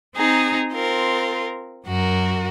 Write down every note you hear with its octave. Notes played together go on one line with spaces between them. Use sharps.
C4 D#4 G#4 A#5
C4 F4 A#4
F#2 F#4 A#4